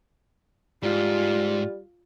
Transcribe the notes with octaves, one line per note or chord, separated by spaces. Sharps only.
G#2 G3 F4